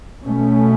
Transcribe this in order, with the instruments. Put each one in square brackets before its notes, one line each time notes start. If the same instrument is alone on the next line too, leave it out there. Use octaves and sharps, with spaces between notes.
[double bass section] B2 A3 C#4